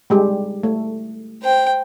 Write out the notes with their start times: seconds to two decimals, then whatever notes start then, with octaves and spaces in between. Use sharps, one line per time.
0.10 G3 G#3 G4
0.63 A3
1.42 C5 G5